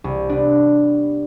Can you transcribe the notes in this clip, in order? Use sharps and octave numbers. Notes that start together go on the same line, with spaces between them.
C2
B3 D4